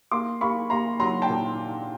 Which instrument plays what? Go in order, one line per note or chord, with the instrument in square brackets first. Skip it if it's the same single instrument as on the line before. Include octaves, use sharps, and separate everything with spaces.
[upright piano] A#3 C6 D6
A#3 B5 C#6
A#3 A#5 C6
F#3 A#5 C6
G5 A5
A#2